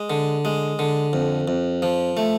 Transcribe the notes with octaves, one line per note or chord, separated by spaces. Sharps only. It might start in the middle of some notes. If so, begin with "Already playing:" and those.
Already playing: G#3
D3
G#3
D3
F2
F2
F3
A3